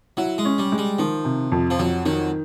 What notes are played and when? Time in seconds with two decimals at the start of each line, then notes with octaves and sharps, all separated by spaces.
0.17 F#3 E4
0.38 G#3
0.45 C#4
0.58 G3
0.72 G#3
0.78 G3
0.99 D#3 F3
1.25 C3
1.52 F2
1.70 F3
1.79 F2 F#3
2.06 D#3 F#3